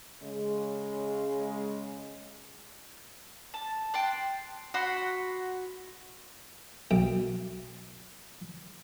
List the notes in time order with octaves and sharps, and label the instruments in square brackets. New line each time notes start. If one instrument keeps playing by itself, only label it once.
[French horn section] C#3 G#3
[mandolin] A5
G5 A5 C6 F#6
F#4 F#5 B5 C6
[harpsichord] B1 G5